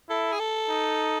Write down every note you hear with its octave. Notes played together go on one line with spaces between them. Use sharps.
E4 A4
G#4
A4
D#4